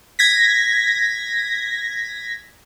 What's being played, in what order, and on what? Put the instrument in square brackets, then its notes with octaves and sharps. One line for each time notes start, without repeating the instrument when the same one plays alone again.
[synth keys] G#6 A#6 B6